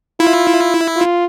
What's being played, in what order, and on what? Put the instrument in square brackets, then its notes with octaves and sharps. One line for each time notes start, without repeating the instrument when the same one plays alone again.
[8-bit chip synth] E4 [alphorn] F4
[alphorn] F4